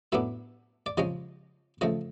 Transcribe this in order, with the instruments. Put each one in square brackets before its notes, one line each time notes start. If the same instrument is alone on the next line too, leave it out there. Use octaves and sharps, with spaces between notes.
[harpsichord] A2 F#3 B3 D4 E5
D5
C#3 F3 G#3 C#4 D#5
C#3 F3 A3 D#5